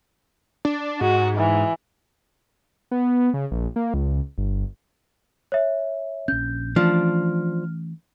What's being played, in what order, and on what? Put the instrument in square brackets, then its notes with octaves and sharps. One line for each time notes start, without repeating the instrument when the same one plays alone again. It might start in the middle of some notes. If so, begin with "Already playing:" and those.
[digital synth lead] D4
[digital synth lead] G#2 [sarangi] F#4
[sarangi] E3
[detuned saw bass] B3
C#3
A#1
A#3
C#2
G1
[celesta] C#5 E5
[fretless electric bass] A#1 C#4 [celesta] G6
[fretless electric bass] E3 A3 C#4 [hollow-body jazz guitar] F3 D4 [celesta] F6